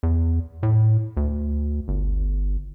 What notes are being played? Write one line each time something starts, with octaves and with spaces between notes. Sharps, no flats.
E2
A2
D2
G1